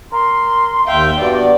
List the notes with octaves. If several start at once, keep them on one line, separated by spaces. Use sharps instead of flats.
A#4 C6
D#2 E5 F5 G5
G2 B3 F#4 D5